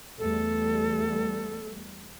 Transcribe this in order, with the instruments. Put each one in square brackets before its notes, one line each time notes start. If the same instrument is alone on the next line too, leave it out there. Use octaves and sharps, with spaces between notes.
[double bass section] E2 G3 A3 [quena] A4